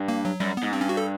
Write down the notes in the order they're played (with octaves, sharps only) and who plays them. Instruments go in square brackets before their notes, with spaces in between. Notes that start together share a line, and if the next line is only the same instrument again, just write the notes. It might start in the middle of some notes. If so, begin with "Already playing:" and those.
Already playing: [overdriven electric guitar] G2
[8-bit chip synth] A#3
F#3
[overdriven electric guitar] F#2 [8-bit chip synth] G3
[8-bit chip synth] B3
[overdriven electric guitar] G#2
[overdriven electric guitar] G2 [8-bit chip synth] C4
[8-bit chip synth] C#4
F#4
A4